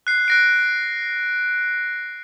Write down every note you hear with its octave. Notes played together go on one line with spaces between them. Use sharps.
F#6 C7
F#6 A#6 D7